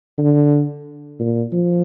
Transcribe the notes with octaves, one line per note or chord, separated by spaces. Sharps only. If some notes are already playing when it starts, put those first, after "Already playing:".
D3
A#2
F3